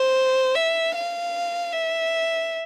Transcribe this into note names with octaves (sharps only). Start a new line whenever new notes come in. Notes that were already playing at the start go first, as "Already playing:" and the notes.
Already playing: C5
E5
F5
E5